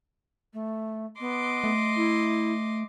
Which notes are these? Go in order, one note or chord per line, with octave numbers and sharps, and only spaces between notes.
A3
B3 D#5 C6 D6
A3
E4